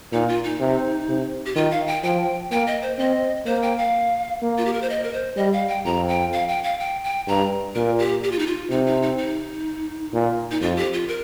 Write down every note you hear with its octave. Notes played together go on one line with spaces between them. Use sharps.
A#2 D#4
F4
D#4
C3
C3
G4
D#3 F4
F5
G5
F3 G5
A#3 G5
D#5
C5
C4 D#5
A#3 C5
G5
F5
A#3
F4
G4
A#4
C5
D#5
A#4
C5
G3 D#5
F5
G5
F2 A#5
G5
F5
G5
F5
G5
G5
G2 A#5
A#2 A#4
G4
G4
F4
D#4
F4
C3 D#4
D#4
D#4
D#4
A#2
D#4
F2 F4
G4
F4
A#4